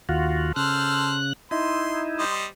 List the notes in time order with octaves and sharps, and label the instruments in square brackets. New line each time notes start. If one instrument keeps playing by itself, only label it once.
[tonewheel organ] D#2 F4 F#4
[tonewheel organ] C#3 F#6 [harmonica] A4 C5 F6
[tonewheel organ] D#4 E4 [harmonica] C6
[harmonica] G3 C5 D#5